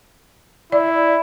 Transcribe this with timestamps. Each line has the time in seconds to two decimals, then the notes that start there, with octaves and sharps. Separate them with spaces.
0.72 E4 D5